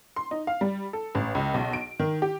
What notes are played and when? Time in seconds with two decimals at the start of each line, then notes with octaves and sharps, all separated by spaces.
0.16 C6
0.31 D#4
0.47 F5
0.61 G3
0.93 A4
1.15 A1
1.35 C#2
1.54 B1
1.73 D7
1.99 D#3
2.22 G4